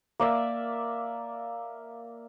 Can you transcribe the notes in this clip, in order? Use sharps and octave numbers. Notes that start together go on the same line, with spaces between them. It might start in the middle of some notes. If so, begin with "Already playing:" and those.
A#3 D5 E5